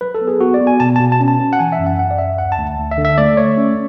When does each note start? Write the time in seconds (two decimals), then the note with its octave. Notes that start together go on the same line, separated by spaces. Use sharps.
0.01 F#3 B4
0.15 A4
0.21 B3
0.28 G#4
0.40 B3 F#4
0.54 D5
0.61 B3
0.67 G#5
0.80 B2 A5
0.96 A5
1.00 B2
1.12 A5
1.20 C#4
1.28 A5
1.40 C#4
1.53 F#5
1.59 E3 G#5
1.72 E5
1.79 F#2
1.86 F#5
1.99 F#2 F#5
2.11 D5
2.18 F#2 E5
2.38 D2 F#5
2.52 A5
2.59 D2
2.78 D2
2.91 E5
2.98 D3
3.05 E5
3.18 A3 D5
3.37 A3 C#5
3.57 C#4